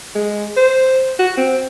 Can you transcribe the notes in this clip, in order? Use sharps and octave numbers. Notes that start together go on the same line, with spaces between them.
G#3
C5
F#4
C4